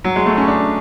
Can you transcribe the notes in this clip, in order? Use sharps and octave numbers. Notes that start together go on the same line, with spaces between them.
F#3
G#3
A3
C#4
D4